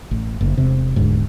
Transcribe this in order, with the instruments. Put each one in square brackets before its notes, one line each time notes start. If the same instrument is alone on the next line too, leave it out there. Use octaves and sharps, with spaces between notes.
[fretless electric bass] A1
F#1
E1 C3
E1 D2 G#2